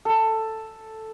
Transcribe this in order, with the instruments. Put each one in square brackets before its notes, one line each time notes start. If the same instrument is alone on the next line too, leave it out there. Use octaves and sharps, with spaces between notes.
[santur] A4